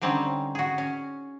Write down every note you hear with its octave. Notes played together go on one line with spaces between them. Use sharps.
D3 G3 C4 C#4 D#4
F#4 G#4
C#4